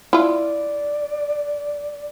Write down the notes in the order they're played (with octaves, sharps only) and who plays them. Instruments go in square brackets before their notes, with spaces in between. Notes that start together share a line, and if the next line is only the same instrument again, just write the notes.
[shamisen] E4 F4 [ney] D5